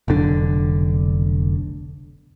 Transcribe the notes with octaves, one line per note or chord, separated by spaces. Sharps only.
F1 B1 D3 D4